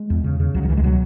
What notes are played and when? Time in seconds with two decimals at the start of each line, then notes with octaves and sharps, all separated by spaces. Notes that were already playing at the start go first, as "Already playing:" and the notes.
Already playing: G#3
0.10 E2
0.24 C#3
0.40 C#3
0.55 C#2 F#3
0.63 D#3
0.69 C#2 E3
0.77 G#3
0.84 B2 F#3